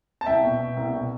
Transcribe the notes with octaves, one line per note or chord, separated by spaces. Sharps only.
A5
C2 E5 G5
B2
B2
C2
B2